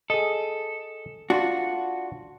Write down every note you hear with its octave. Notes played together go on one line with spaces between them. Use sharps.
G#4 A4 D#5
D4 F4 F#4